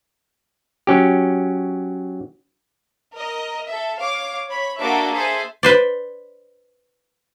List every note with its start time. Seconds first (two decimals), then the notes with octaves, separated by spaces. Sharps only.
0.87 F#3 C#4 G4
3.13 A#4 D#5
3.68 A4 E5
3.99 C#5 F5 D6
4.48 C#5 B5
4.79 A#3 D4 F#4 A4 E5 D6
5.12 G#4 A4 C5 E5 G#5
5.63 B4 C5 D5